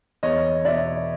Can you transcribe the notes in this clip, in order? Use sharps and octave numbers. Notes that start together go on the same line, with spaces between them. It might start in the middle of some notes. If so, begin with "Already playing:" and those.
E2 C#5 D#5
B2 D5 E5